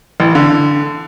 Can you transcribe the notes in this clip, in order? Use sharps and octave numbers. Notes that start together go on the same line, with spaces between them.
A1
D3